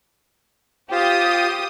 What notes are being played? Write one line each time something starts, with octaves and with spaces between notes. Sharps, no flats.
F4 G4 C5 D#6